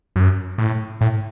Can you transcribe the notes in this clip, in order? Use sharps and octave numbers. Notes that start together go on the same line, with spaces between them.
F#2
A2
A2